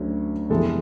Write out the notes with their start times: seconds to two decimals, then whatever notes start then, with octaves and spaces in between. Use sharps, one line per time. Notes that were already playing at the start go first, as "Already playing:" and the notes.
Already playing: D2 D3 F#3 A3 C#4
0.50 F2 C3 E3 G#3 B3 A4